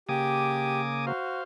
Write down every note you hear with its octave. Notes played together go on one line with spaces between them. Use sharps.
C#3 A#3 G4 G#5 D6 D#6
F#4 C5 F5